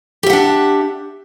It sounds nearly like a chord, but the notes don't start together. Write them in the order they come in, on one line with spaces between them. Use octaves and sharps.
G4 E5 F#5 D4